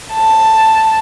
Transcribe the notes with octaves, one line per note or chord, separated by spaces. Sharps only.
A5